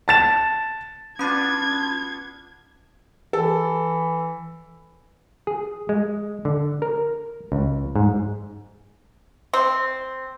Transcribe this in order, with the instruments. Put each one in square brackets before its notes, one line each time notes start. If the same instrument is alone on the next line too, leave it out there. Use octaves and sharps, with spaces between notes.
[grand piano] A5 A6 E7
[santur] B3 D4 F4 [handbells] C#4 B5 A6 [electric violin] G#6
[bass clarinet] E3 [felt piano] A4
[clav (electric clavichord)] G#4
G#3
D3
A#4
C#2
G#2
[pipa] C4